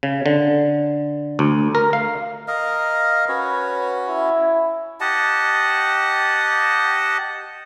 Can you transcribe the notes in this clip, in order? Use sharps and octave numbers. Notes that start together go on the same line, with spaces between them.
C#3
D3
D2
A#4
F5
A#4 D#5 F5
C#4 F#4 B4 C#5
E4
G4 D#5 F#5 A5